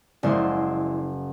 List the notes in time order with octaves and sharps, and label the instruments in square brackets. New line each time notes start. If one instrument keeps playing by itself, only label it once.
[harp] F#1 G#3 [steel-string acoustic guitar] E4 C5 D5